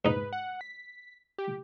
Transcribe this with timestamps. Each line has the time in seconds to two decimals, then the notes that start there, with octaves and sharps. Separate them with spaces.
0.05 G#2 D#4 B4
0.33 F#5
0.61 B6
1.38 G4